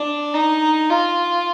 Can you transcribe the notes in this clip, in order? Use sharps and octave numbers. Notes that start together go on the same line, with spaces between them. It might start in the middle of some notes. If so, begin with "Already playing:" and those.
Already playing: D4
D#4
F4